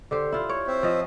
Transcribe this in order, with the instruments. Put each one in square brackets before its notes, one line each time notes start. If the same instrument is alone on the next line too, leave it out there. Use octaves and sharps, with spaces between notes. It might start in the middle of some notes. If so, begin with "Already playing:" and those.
[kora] D3 G4 C5
E4 F4
C#5
[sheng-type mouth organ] C4 C5 E5
[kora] F3 D#5